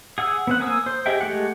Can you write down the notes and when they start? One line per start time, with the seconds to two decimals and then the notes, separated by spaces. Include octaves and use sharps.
0.18 G#4 F#5 E6
0.47 B3 C4 F#5
0.60 A#3 G#5 D#6 E6
0.86 C5
1.06 G4 G#4 D#5 E5 G5
1.21 G#3 A3 G4 F#5